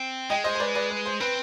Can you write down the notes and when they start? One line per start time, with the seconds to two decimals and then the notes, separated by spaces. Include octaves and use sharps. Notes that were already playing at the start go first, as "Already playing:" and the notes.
Already playing: C4
0.30 G#3 D#5 G5
0.44 C5 D#5
0.55 C5
0.60 B4 D5
0.75 B4 D5
0.90 B4
1.06 C5
1.20 C4 B4